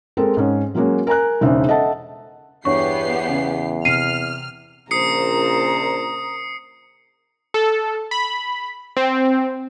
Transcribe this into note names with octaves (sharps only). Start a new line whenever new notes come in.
G#3 C4 A4 A#4
G#2 C#4
F#3 G#3 A#3 C#4 F#4
A#4 G#5 A#5 F#6
E1 C#3 D4 D#4 C5 E5
A4 D#5 E5 F#5 A5
E2 G2 B3 G4 C#5 C#6 C7
C#3
C3 F6 C7 D#7
A#1 C#3 A#4 C5 A#5 D#6 C7 C#7
A4
B5
C4